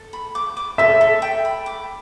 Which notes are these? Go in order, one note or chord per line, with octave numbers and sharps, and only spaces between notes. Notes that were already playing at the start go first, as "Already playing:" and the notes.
Already playing: A4
B5
D6
D6
A4 E5
A4
G5
B5
D6